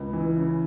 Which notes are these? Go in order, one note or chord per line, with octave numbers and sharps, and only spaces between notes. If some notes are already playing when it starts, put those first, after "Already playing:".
Already playing: C#2
E3
C#3